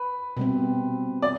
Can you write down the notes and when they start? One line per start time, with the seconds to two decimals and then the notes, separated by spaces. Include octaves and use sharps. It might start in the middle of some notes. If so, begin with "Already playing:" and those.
Already playing: B4
0.37 B2 G3 C4
1.22 D5